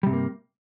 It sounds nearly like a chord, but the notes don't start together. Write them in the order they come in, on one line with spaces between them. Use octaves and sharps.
G3 C3 G2 A#3